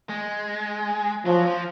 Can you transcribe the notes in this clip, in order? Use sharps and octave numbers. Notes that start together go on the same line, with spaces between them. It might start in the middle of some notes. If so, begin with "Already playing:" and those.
G#3
F3 F#3
F3